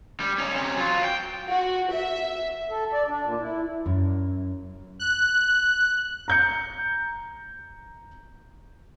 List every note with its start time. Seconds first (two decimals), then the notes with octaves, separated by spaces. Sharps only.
0.20 G3
0.38 C#4 D#4
0.53 C3 C#4
0.77 F#3 F4
1.04 G5
1.49 F#4
1.92 E5
2.70 A4
2.93 D5
3.08 D4
3.24 A#2
3.40 E4
3.86 F#2
5.00 F#6
6.28 A#5 G6 C#7